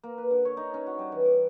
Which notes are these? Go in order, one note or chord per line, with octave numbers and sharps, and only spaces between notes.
A#3
B4
D3
C#5
D#4
C#4
F#4
G3
E3
D6